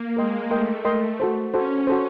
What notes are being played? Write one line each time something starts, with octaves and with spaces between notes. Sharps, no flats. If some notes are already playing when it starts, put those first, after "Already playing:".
Already playing: A#3
G#3 A#4 D#5 G5 C6
A3 A#4 D#5 G5 C6
A#4 D#5 G5 C6
F#4 A4 C5
C#4 F#4 A4 C5
F#4 A4 C5